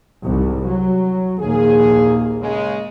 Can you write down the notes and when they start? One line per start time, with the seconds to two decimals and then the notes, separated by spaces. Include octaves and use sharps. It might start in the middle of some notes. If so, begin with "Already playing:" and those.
0.23 C2 G#2
0.66 F#3
1.40 A#1 D#2 A#3 G#4
2.41 C#3 G#3